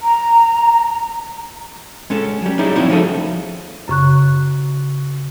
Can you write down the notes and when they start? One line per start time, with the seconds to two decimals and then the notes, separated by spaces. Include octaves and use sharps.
0.01 A#5
2.10 G#3 C#4 A4
2.42 F#3 G3
2.59 D#4 E4 G#4 C#5 D5
2.75 F3 C4 C#4 E4 F#4 C#5
2.90 F3 A3 D#4 G#4 A4
3.88 F#2 C#3 C#6 F#6